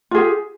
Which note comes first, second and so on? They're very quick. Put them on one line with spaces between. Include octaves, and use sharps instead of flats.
F4 G#4 G4